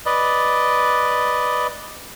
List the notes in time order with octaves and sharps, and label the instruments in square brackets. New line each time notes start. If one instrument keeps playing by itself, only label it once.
[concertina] B4 D5 D#5